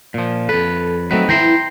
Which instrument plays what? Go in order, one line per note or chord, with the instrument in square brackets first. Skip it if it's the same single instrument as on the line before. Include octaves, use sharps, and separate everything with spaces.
[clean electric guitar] A#2 F3
[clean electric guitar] F2 B4 [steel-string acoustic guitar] A4
[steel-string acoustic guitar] F#3 A3 [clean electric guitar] C4 D#4 B4
[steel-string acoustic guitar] E3 E4 [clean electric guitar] G5 A#5 C6